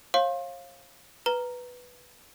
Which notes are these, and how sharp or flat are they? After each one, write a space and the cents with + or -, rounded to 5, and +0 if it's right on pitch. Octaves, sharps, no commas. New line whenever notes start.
C#5 -40 F5 +0 C6 +35
B4 +0 A#5 +0